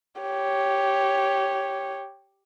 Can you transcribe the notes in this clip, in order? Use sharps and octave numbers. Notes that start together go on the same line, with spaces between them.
G4 C#5